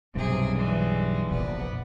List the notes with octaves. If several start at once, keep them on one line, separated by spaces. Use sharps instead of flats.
B1 G2 C3 G#4
E3 G3 G#3
F1 A#1 B3 D5